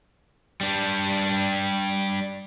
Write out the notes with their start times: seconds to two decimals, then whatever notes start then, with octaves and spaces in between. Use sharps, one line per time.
0.61 G3 D4